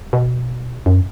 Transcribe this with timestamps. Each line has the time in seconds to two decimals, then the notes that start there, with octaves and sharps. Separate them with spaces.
0.13 B2
0.86 F#2